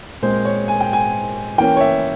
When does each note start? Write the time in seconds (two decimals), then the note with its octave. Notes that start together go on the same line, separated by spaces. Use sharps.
0.22 A#2 G#3 C4 C5
0.45 C#5
0.68 G#5
0.81 G5
0.93 G#5
1.58 E3 A#3 C#4 G5
1.77 C#5
1.81 E5